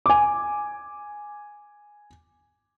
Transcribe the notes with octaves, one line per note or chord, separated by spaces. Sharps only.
G#5 D6